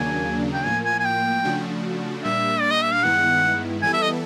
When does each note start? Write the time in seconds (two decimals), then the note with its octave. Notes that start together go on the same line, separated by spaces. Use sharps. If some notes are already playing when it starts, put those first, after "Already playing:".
Already playing: D#2 C#3 F#3 A#3 D4 G#5
0.53 G5
0.65 A2 F3 A#3 G#5
0.85 G#5
1.00 G#5
1.05 G5
1.44 C#3 F3 A3 D4 F#4
2.24 A#2 G3 A#3 D4 E5
2.61 D5
2.71 D#5
2.82 E5
2.92 F5
3.03 G2 D#3 G#3 B3 E4 F#5
3.82 E3 G3 B3 E4 A4 G#5
3.93 E5
4.03 D#5